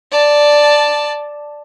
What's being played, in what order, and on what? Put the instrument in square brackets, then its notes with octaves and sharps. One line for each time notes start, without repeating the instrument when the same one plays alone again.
[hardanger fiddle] D5 A5